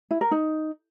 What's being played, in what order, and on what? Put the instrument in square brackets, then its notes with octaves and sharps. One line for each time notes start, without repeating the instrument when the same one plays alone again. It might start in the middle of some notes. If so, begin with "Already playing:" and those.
[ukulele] E4
A#4
D#4